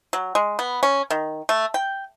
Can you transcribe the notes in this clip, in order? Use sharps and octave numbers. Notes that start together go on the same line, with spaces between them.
F#3
G#3
B3
C#4
D#3
A3
G5